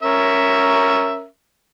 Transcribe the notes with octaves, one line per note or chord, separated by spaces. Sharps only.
C#4 A#4 E5